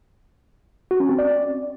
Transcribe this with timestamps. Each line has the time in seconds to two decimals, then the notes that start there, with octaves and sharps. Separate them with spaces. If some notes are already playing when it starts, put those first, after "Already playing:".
0.91 F#4
1.00 C#4
1.09 C4
1.19 D5